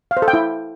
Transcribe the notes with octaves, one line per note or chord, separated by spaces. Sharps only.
F5
C5
A4
G5
E4